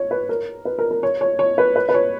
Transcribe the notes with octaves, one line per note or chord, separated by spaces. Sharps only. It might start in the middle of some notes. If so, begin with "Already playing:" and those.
Already playing: C#5
B4
A#4
B4
A#4
A#4
C#5
C#5
C#5
B4
B4
B4
C#5